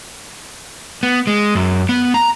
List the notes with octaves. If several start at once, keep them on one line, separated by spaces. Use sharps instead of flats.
B3
G#3
F#2
B3
A#5